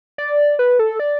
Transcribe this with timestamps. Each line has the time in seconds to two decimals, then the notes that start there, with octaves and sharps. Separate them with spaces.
0.18 D5
0.59 B4
0.79 A4
1.00 D5